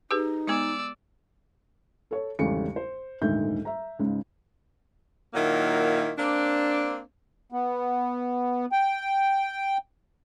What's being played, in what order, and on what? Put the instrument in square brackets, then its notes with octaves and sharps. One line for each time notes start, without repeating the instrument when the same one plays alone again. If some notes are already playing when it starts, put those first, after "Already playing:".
[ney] D#4 [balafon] G4 G#4 B4
[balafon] G#3 B3 [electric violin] D5 E6
[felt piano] A4 C#5
G#1 E2 C#3 G3 A3 C#7
C5
D#1 D2 G#2 D#3 E5 G6
E5 A#5
C#2 G#2 C#3
[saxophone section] A#2 D#3 F#3 A#3 E4
A#3 C4 D4
[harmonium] B3
G5